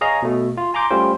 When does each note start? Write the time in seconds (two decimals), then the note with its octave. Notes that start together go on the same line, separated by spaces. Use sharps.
0.01 G#4 C#5 D#5 F5 G#5 A#5
0.22 B2 A3
0.57 F4
0.74 G#5 A#5 C6 D6 G6
0.90 G3 A3 C#4 F4 C5 G5